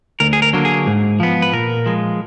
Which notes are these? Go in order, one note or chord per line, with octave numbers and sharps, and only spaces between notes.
D2 A#4
G#4
A#4
D3 F#3 A#3
G#4
G#2
F3 B3
B4
A#2 A#4
F3 G#3